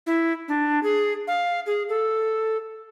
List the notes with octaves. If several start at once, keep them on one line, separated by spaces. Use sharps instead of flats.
E4
D4
G#4
F5
G#4
A4